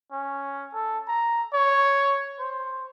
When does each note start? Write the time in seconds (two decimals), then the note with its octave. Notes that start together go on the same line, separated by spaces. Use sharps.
0.12 C#4
0.74 A4
1.08 A#5
1.53 C#5
2.39 C5